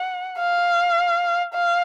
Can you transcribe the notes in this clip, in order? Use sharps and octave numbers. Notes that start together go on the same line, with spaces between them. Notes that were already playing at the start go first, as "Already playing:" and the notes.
Already playing: F#5
F5
F5